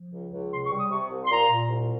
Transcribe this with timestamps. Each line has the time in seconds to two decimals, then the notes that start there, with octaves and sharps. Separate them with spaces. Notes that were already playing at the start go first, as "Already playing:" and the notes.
Already playing: F3
0.12 C#2
0.32 C#2
0.51 C3 C6
0.64 C#6
0.71 G3
0.77 D#6
0.90 C3 C#6
1.10 C2
1.24 C6
1.30 A#2 A#5
1.49 A#2
1.69 C2